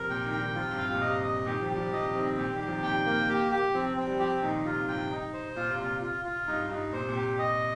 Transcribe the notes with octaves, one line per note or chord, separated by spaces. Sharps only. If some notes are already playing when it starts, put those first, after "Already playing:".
Already playing: C3 F3 A#4
A#2 G5
A#2 D#3
G5
D#3 G3
C3 F3 F4
G2 C3
F5
C3
A#2
G2 C3 D#5
D#5
A#2 D#3 G4
C3 F3
G3 G4
C3 F3
C3 F3 D#5
F3
D#3 G3 C4
A#2 D#3 G4
D#3 G3
G4
C3 F3
A#2 D#3 G5
A#3
G4
G4
C3 F3 C4
C4
G3
C3 F3 G4
A#2 D#3 D#4
C3 F4
D#3
G2 C3 G5
D#4
C5
A#2 F4
C3
A#2 F4
F4
F4
G2 D#4
G2 D#4
A#2 C5
C3
A#2
G4
D#5